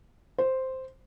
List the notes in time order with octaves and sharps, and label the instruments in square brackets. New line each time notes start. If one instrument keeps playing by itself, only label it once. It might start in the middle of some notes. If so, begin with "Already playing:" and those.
[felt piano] C5